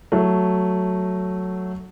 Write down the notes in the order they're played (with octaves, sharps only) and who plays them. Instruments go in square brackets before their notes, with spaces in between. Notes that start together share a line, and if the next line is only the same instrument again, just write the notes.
[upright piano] F#3 A3